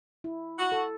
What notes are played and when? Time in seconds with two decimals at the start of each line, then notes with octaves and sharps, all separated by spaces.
0.24 E4
0.59 F#4
0.72 A4